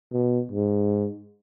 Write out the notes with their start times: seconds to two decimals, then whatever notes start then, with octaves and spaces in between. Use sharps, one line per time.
0.12 B2
0.52 G#2